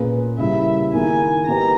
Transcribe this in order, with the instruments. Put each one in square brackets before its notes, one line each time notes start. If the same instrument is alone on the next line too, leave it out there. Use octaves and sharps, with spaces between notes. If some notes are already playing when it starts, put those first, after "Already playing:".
Already playing: [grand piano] A#2 A#3 C#4 G#4 B4
[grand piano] C#3 G3 A#3 E4 [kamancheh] E5
[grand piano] D#3 A#3 E4 G#4 [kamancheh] G#5
[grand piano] D#3 A#3 D#4 G4 B4 [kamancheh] A#5